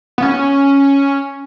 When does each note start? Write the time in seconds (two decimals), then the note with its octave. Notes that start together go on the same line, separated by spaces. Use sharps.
0.18 B3
0.22 C#4